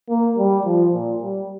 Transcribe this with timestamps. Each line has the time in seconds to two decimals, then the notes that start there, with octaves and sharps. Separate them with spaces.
0.09 A#3
0.38 G3
0.65 F3
0.94 A#2
1.22 G3